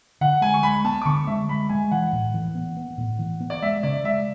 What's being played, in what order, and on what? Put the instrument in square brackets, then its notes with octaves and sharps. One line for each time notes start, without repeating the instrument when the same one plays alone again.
[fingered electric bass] D3 [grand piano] F#5
[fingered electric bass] G#3 [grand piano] G#5
[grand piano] C#6
[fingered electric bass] G#3 [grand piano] B5
[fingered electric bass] B3 [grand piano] A5
[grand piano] D6
[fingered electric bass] D3 [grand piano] C#6
[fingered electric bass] G#3 [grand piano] E5
[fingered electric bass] G#3 [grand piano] B5
[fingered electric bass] G#3 [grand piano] G#5
[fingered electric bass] E3 [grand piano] F#5
[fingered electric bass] A2
E3
B3
B3
A2
E3
B3
[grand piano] D5
[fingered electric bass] G#3 [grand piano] E5
[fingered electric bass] C#3 [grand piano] D5
[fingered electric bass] G#3 [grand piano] E5